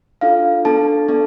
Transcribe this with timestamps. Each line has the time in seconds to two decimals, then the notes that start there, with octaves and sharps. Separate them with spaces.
0.21 D4 F4 A4 F5
0.65 B3 D4 A4 A5
1.08 B3 D4 A4